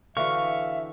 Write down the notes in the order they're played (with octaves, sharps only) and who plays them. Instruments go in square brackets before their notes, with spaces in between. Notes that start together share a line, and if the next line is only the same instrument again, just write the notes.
[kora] D3 E3 F#4 [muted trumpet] E5 [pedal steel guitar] F5 C#6